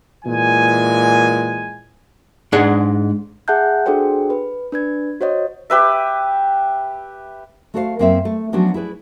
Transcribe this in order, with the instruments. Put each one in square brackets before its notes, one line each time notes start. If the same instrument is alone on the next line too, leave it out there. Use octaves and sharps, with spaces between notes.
[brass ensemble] A#2 E3 G#3 G#5
[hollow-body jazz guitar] G#2 G#3 D4 G#4 F#5
[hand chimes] G#4 E5 F#5 A5 F#6 G6
D4 F#4 G#4 A4 C5 G5
B4
D4 B4 G#6
F#4 C5 C#5 D#5
[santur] G4 B4 E5
[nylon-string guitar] A3 F#4 A4 C5 C#5 F5
F#2 A#3 C4 A#4 E5
A3
F3 F#3 B3 C#4 D4 F#4
E4 G#4 B4 D5